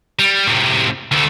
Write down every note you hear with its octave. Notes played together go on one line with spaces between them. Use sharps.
G3
A2 C3
D2 A3